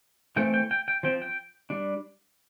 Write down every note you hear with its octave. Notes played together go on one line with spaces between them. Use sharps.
E3 A3 C4 G5
G5
G5
G5
F3 C4 G5
G5
G3 D4